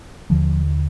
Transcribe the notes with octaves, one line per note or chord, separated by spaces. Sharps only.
D#2 D3 F3